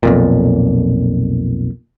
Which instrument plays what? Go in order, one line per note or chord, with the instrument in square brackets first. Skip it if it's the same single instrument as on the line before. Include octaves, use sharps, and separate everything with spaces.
[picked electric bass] B1 F2 A#2